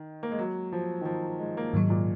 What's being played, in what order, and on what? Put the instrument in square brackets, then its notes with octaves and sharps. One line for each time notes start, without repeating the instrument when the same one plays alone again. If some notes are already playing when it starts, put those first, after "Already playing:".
Already playing: [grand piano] D#3
A#3
G#3
F#3
F3
D#3
F3
G#3
A#3
[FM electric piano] G#2 D#3 F#3 [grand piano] G#3
[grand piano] A#2